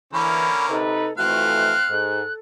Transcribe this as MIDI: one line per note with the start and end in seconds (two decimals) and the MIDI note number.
0.13 0.82 50
0.13 0.48 52
0.13 0.82 58
0.13 0.82 61
0.13 0.65 83
0.69 1.08 48
0.69 1.08 63
0.69 1.13 69
0.69 1.08 71
1.17 1.74 41
1.17 1.74 52
1.17 1.74 57
1.17 1.94 60
1.17 1.72 66
1.17 1.94 77
1.17 2.33 90
1.90 2.21 44
1.90 2.39 69